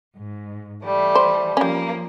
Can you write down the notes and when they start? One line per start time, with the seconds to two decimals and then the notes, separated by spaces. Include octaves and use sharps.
0.15 G#2
0.84 E3 G3 A3
1.15 C5
1.57 F3 G3 A#3 C#4